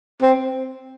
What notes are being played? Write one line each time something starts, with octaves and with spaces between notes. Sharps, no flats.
C4